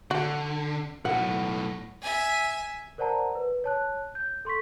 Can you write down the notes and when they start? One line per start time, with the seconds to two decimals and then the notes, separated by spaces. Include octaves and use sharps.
0.11 D3 F#4
1.05 B1 A2 F#5
2.01 E5 G#5
2.98 A#4 C5 D5 F#5 A5 A#5
3.35 B4
3.64 C#5 A5 F#6
4.15 G6
4.45 A4 C6 C#6 B6